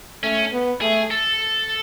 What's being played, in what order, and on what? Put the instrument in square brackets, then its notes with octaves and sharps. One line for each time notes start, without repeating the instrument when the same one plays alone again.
[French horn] A3 [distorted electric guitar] C#4
[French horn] B3
[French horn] A3 [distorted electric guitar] G#4
[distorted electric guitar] A4